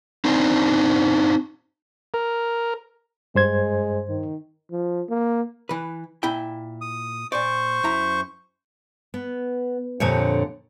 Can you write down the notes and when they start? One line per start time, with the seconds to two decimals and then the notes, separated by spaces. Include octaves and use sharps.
0.25 C4 D4 D#4 C5
2.14 A#4
3.35 G2 G#3 C5 G#6
4.09 D#3
4.71 F3
5.09 A#3
5.69 E3 B4
6.23 A#2 E4 G5
6.81 D#6
7.32 A#2 C5 D5 C#6
7.84 F#2 E4 A#5
9.14 B3
10.00 F2 A#2 D3 G4 C#5